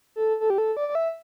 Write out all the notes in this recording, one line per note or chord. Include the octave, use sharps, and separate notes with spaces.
A4
A4
G4
A4
D5
D5
E5